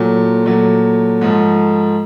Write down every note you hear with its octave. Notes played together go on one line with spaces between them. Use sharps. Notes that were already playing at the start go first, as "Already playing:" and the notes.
Already playing: A#2 F#3 A3
A#2 F#3 A3
G#2 F3 A3